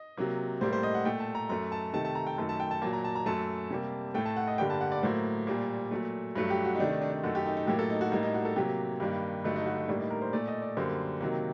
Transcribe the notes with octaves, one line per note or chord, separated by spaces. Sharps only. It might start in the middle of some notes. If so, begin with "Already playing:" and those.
Already playing: D#5
C3 F#3 A#3
A2 G3 A#3 C5
C5
D#5
F#5
A#2 A3 G5
A5
A#5
F#2 F#3 A3 A#5
A5
C3 D#3 A3 A5
A5
A#5
G5
F#2 D#3 A3 A5
A5
G5
A5
A#2 F#3 A#3 A5
A#5
A5
A#5
F#2 F#3 A3 A5
C3 G3 A#3
A2 A3 G5
A5
F#5
D#5
G2 D3 G3 A#3 G5
A5
F#5
D5
A2 F#3 A#3 C5
A#2 G3 A#3
A#2 F#3 A3
G2 F#3 A3
G4
F#4
D#4
C3 D#3 A3 D4
D#4
D4
D4
F#2 D#3 A3 F#4
G4
D#4
D#4
A2 F#3 A#3 G4
A4
D#4
F#4
A2 G3 A#3 D#4
D#4
F#4
A4
C3 F#3 A#3 G4
G2 D#3 G3 A#3
G2 D3 F#3 A3 D#4
D#4
F#4
D#4
A2 G3 A#3 D4
D#4
A#4
C5
A#2 A3 D5
D#5
D5
F#2 D3 G3 A#3 C5
C3 D#3 F#3 A#3